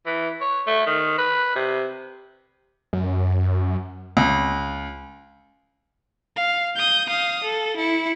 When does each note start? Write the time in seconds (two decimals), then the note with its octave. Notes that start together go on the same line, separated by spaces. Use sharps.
0.06 E3
0.41 C#5
0.67 A3
0.87 D#3
1.18 B4
1.56 C3
2.93 F#2
4.17 C#2
6.37 F5
6.76 D#6 G6
7.09 F5 D#6
7.44 A4
7.77 E4 C#7